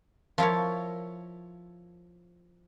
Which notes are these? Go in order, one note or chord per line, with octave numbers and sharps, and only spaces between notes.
F3 E4 A#4 C#5